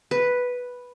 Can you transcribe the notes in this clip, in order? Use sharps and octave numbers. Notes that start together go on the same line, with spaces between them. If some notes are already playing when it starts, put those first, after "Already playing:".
B4